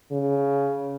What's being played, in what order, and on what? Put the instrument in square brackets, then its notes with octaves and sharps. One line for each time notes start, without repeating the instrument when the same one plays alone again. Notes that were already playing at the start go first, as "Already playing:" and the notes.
[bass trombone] C#3